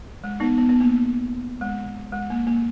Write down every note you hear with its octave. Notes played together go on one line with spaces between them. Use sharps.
G#3
B3 D#4
B3
B3
A#3
G#3
G#3
A#3
A#3